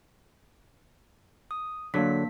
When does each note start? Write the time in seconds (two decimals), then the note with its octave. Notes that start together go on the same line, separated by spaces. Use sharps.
1.51 D#6
1.94 D3 F#3 A#3 D4 B6